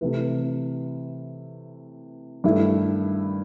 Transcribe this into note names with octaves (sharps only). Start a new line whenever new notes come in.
C3 E3 A3 E4 B4
G2 D#3 A3 E4